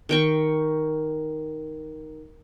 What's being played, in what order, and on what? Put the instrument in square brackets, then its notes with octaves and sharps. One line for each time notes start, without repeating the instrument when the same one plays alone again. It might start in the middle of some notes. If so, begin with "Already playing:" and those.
[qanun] D#3 G5 C#6